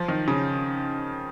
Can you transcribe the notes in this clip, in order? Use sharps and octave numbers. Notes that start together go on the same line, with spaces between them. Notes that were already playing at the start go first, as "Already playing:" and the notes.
Already playing: F3
D#3
C#3